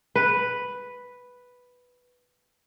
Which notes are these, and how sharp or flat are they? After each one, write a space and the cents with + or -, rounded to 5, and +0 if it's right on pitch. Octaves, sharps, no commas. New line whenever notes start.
B4 +0